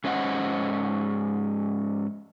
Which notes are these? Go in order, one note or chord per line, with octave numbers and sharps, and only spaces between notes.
G#2 C#4 C5 D#5 F#5